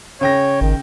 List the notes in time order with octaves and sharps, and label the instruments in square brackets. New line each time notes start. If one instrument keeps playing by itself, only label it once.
[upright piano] C#3 G5 A#6 [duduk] C#5
[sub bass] G#1 [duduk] D#3